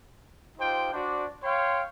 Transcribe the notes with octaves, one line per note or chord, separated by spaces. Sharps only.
D#4 F4 G4 C5 G5
D4 F#4 C5 D5
C#5 F5 G5 C6